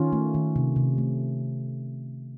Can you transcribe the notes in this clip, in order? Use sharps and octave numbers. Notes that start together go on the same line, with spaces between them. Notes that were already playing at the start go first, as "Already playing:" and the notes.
Already playing: D#3 C#4 F4
A3
D#3
C3
C3
A3